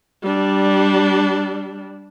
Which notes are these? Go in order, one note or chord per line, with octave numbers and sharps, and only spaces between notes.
G3 D4